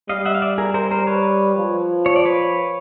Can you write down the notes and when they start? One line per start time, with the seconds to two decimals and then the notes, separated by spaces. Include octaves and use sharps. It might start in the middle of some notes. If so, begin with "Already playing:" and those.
0.09 G3 D#5 F5
0.25 E5 F#5
0.35 F5
0.42 D5 E5
0.58 G#4 A#4
0.74 A#4 C5
0.91 A#4 C5
1.07 B4 C#5
1.57 F3
2.06 C#5
2.16 D5
2.25 B4 C#5